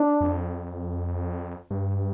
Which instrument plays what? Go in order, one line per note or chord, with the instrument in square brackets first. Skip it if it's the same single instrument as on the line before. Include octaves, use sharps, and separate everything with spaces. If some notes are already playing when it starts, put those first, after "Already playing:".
Already playing: [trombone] D4
[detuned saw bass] F2
G2